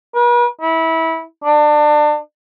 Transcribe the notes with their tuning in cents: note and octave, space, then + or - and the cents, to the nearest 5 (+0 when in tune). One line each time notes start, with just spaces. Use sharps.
B4 -45
E4 -25
D4 +25